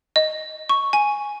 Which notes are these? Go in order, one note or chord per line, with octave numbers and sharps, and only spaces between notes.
D#5
C#6
G#5